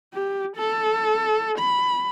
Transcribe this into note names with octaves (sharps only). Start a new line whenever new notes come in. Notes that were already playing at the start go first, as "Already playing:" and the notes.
G4
A4
B5